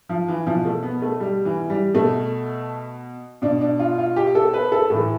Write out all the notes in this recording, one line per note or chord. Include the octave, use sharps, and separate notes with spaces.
F3
E3
B2 F3
A3
B3
A3
G3
E3
G3
B2 A3
B2 D4
D4
F4
F4
G4
A4
B4
A4
A2 E3 A4